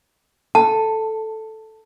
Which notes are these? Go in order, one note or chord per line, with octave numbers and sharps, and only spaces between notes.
A4 A5